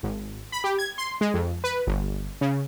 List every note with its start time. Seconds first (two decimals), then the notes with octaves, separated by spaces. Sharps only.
0.03 G#1
0.52 B5
0.64 G4
0.78 G#6
0.98 C6
1.21 G#3
1.34 F2
1.64 B4
1.87 G1
2.41 C#3